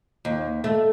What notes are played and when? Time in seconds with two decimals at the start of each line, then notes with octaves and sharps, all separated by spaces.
0.25 D#2
0.64 A3